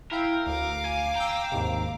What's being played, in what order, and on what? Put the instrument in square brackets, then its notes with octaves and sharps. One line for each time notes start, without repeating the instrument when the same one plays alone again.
[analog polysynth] E4 F5 G5 [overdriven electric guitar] A#4
[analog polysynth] D2 [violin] F5 D6
[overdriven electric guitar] G#5
[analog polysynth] G5 E6 [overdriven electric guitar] A#5
[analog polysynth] D#2 G#2 C3